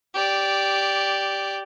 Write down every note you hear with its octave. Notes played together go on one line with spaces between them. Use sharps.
G4 D5